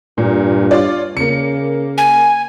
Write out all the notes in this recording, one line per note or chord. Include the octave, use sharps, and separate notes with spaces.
G2 A#2
F4 C#5 D5
C#3 A#3 C#7
G#5